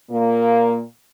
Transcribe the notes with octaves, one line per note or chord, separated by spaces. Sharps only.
A#2 A#3